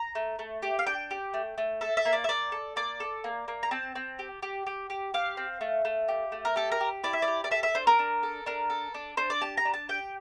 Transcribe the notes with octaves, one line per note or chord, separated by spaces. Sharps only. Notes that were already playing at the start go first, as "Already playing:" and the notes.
Already playing: A#5
A3
A3
G4
F5
D4 G5
G4
A3
A3
A4 E5
E5
A#3
D5
E5
A#3 D5
A4
A#3 D5
A4
A#3
A#3
A#5
C4 A5
C4
G4
G4
G4
G4
G4 F5
C4
A3
A3
G4
A3
A#4
G4 A4
A#4
G4
E4 D5
E5
D5
G4
D5
A4 E5
E5
D4 C5
A#4
D4
A4
D4 A#4
A4
D4
D4 C5
D5
G4 A5
A#5
D4
A5
G4 G5